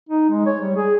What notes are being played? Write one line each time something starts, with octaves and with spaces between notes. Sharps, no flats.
D#4
G#3
C#5
G3
G#4